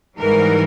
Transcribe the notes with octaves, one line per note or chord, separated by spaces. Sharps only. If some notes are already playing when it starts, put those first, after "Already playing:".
G#2 E3 G3 A#4